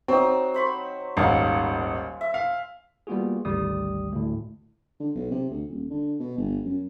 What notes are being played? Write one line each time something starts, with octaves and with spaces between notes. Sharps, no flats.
F#3 C4 D#4
C5 B5 C#6
D#1 G#1 D#3 F5 G#5
E5
F5
G3 A#3 B3 F4 F#4 G#4
G#1 D2 G3 D#6
D2 A2
D3
B1
C3
D2
D#1
D3
B2
G1
F#2